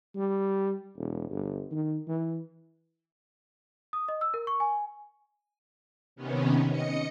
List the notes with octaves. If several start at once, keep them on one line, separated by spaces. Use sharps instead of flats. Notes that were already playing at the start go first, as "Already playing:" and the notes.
G3
E1
G1
D#3
E3
D#6
D#5
E6
A#4
C#6
G#5
C3 D#3 B3 C#4
D#5 C#7